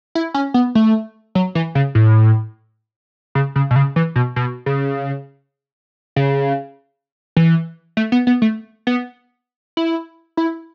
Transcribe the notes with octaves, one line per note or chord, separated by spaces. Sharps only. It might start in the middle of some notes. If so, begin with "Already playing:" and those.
E4
C#4
B3
A3
F#3
E3
C#3
A2
C#3
C#3
B2
C#3
E3
B2
B2
C#3
C#3
E3
A3
B3
B3
A3
B3
E4
E4